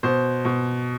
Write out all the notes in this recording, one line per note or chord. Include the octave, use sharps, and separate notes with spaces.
B2 C5
B2